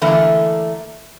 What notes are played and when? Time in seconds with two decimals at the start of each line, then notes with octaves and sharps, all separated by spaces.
0.02 D3 E3 A3 A#3